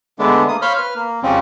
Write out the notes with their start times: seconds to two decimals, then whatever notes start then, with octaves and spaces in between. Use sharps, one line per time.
0.19 D3 G#3 A3 B3 D4
0.48 A#3 D#6
0.62 C5 C#5 F5 B5 F6 G6
0.78 B4 F6
0.96 A#3
1.23 F2 C#3 F3 G3 C4 C#4